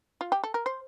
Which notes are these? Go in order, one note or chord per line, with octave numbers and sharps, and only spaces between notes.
F4
G4
A4
A#4
C5